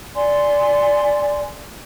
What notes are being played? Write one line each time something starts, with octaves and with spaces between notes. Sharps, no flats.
D5 G#5 C6